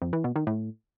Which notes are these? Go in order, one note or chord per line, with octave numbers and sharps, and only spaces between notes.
F2
E3
B2
D#3
A2